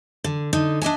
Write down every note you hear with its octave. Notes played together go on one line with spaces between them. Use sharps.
D3
D3 D#4
D4 D#5 E5 G#5